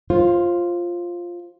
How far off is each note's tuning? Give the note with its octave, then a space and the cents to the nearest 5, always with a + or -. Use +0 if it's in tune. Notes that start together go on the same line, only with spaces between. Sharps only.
F4 +0 C5 +30